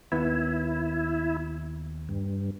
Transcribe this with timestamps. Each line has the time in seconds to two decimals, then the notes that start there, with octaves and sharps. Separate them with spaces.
0.12 D#2 B3 E4
2.09 G2